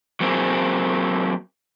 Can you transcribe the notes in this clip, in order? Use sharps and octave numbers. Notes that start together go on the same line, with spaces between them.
F#3 A#3 C4 G#4